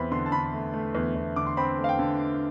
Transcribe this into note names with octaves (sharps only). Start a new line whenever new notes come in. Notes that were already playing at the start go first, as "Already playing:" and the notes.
Already playing: E2 C4 B5
D3 C6
A5
D3 B5
A3
A3
E2
E2
D3 D6
C6
C4 B5
A3
F5
G5
D3